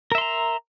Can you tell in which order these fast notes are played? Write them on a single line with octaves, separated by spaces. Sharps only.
A#4 E5 C6 A#5